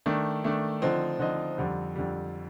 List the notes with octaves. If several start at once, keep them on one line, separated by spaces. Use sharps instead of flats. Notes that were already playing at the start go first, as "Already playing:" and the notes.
D#3 A3 D4
D#3 A3 D4
D3 F3 C4 D#4
D3 F3 C4 D#4
F2 D3 G3
F2 D3 G3